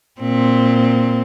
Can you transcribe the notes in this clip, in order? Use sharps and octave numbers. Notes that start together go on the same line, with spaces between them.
A#2 C4